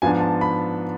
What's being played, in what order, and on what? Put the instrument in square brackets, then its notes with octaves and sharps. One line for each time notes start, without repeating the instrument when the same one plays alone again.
[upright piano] G#2 F3 B3 D4 G#5
A5
B5